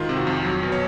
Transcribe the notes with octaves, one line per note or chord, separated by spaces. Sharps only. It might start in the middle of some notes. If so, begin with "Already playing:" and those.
Already playing: G#2 D#3 F4
C3
F#4
F2
F#3
B2
C#5